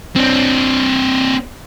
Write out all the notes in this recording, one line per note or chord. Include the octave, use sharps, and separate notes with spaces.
C4 D4